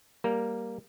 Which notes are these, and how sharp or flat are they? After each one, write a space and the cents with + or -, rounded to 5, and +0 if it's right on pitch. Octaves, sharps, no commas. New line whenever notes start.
G3 +0 A#3 +0 A#4 +0